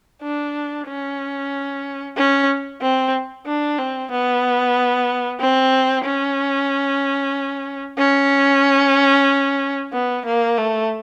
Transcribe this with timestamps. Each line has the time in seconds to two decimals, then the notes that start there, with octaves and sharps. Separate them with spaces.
0.23 D4
0.88 C#4
2.17 C#4
2.82 C4
3.47 D4
3.79 C4
4.11 B3
5.41 C4
6.05 C#4
7.99 C#4
9.93 B3
10.26 A#3
10.58 A3